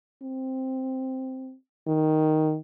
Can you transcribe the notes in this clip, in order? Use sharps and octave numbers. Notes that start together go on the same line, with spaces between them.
C4
D#3